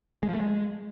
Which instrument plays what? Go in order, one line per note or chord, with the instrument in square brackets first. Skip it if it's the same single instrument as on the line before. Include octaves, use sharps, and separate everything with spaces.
[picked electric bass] G#3
F3
A3
G#3